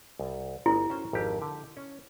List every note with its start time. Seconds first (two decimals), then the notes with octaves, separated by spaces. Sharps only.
0.19 C2
0.66 G1 E4
0.90 C#4 F#4 C5
1.13 G#1 F2 G4
1.42 D3
1.77 C#4